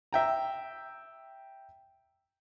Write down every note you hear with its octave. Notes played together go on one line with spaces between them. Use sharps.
E5 G5 A#5